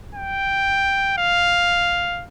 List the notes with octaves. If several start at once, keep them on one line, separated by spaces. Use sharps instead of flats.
G5
F5